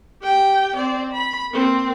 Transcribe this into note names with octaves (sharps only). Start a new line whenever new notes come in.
G4 G5
C4 D5
B5
A#3 C4